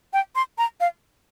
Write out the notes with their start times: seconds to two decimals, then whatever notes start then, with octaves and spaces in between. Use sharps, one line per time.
0.13 G5
0.36 C6
0.58 A#5
0.80 F5